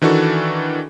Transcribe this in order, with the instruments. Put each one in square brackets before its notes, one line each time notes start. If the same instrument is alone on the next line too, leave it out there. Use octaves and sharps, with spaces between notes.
[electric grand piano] D#3 E3 D4 F#4 A4